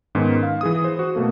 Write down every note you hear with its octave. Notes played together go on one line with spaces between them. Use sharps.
G#2 D#3 G#3 B3 C#4
F5
E3 G#4 D#6
C5
F#4
B2 A3 A#3 A4